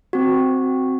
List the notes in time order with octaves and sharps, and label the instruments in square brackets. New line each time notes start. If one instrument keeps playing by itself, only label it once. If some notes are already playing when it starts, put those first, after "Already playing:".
[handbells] C4 F#4